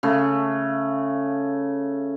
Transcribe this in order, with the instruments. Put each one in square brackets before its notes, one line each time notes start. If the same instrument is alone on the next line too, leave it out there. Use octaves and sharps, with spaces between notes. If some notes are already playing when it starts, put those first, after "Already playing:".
[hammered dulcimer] C#3 A3